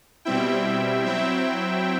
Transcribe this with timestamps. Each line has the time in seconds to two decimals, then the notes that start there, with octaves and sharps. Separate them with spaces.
0.25 B2 G3 C4 E4 E5 G5
1.06 F#3 C4 E4 E5 G5